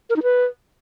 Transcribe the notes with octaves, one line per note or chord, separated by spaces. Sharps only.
A#4
D#4
B4